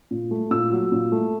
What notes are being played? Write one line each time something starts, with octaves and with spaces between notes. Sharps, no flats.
A#2
A3
A#2 E6
F#3
A#2
A3